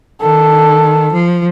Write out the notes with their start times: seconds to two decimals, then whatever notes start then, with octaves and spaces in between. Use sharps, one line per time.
0.21 D#3 A4
1.11 F3